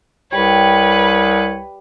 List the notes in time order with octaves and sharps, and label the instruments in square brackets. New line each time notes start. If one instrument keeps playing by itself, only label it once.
[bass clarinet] C2 [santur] G3 [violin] B4 [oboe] C#5